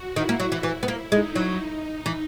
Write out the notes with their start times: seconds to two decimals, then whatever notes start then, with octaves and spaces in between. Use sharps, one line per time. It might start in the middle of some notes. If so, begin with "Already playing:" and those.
Already playing: F#4
0.16 D#3 E4
0.29 A#3
0.40 F#3
0.52 E3
0.63 E3 E4
0.83 B3
0.88 A#3
1.11 G#3 D#4
1.36 F#3
1.58 D#4
2.06 E3